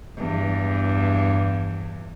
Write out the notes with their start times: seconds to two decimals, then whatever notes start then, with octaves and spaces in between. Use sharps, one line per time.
0.17 E2 G2